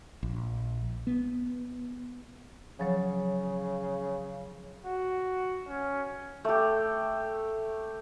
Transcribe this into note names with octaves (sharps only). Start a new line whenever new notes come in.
A#1
B3
C#3 F3 F#3 C#5
F#4
C#4
A3 G4